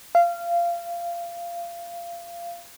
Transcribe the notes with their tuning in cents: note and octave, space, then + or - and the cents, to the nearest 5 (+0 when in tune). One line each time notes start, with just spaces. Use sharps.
F5 -20